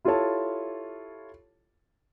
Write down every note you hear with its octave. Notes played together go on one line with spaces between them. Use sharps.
E4 F4 G4 A4 C#5 A5